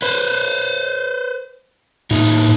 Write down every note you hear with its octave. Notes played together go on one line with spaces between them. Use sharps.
B4 C5
A2 A#3 D#4 E4